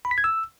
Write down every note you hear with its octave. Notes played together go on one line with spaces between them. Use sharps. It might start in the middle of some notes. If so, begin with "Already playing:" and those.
B5
B6
G#6
E6